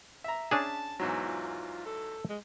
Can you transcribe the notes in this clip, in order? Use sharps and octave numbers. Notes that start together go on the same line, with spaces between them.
E5 A#5
C#4 D4 G#4 A5
E2 G#2 F#3
F4
A4
G#3